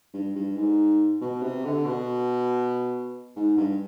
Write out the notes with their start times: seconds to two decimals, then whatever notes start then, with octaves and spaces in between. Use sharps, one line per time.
0.13 G2
0.35 G2
0.56 G#2
1.21 B2
1.42 C3
1.64 D3
1.86 B2
3.36 G#2
3.57 G2